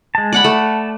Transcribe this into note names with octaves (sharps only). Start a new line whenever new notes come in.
G#3 A5
D5 F#5 B5
A3 A5